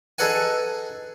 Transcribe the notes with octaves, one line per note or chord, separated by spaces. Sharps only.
D#4 G#4 A4 B4 F#5 G#5